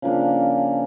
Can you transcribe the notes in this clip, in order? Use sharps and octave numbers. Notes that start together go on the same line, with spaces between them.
C#3 F3 A#3 D4